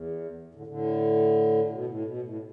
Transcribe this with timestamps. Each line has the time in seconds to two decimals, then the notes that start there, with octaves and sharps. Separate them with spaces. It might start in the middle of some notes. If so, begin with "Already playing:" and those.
Already playing: E2
0.54 A2 D3
0.67 A2 D3
1.70 B2
1.87 A2
2.05 B2
2.22 A2